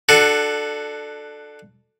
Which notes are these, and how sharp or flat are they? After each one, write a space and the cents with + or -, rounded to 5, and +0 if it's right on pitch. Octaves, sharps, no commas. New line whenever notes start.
D4 +20 F#4 +0 A4 +0